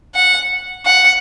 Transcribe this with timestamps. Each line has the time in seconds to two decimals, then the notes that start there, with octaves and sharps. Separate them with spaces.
0.15 F#5
0.86 F#5